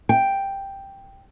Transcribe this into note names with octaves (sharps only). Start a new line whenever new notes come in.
G5